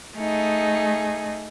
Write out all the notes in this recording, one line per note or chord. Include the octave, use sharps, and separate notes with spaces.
A3 D#4 G#4